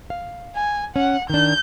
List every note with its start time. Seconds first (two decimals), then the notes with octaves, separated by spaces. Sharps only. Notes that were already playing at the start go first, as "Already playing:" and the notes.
0.10 F5
0.55 G#5
0.96 C#4 F#5
1.30 D#3 D4 G6